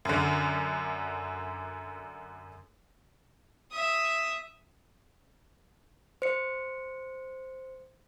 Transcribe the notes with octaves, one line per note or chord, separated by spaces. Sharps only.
F#2 D3
E5 D#6
C5 C#7